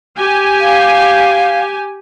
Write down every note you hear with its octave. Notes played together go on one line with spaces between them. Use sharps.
G4 G#5
F5